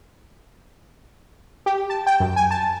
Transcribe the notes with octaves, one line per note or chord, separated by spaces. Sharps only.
G4
A5
G5
F#2
G#5
A5